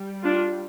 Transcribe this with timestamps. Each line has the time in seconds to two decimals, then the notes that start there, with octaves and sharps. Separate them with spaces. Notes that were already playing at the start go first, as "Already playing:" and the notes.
Already playing: G3
0.23 D4 F4